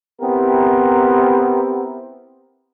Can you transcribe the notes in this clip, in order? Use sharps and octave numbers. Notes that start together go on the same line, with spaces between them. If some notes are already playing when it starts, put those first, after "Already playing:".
B3 C4 E4 G4 A#4